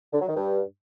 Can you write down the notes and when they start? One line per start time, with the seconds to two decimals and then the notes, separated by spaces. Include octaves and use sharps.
0.13 D3
0.21 F#3
0.29 D#3
0.36 G2